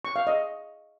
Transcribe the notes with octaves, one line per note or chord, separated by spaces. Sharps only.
C#6
F5
D#5